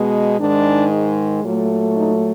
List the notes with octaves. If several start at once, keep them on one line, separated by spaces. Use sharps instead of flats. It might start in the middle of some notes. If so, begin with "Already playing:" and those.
Already playing: B2 G#3 B3
G#2 D#3 G#3 D4
A#2 F#3 A3
D#4